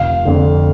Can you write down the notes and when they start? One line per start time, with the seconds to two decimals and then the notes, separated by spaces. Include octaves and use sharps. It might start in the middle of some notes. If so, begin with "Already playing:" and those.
Already playing: F1 F5
0.25 F2 D3